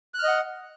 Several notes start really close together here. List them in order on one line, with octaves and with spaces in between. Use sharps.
F#6 F6 D#5 F#5